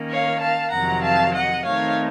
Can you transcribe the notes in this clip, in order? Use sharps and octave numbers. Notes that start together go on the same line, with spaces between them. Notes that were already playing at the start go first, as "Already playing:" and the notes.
Already playing: D#3 A#3 C#4
C#5 F5
F5 A5
F2 C3 D#3 F#3 F#5 A#5
F5 A5
D#5 F#5
D#3 A3 C4 D#4 C#5 F5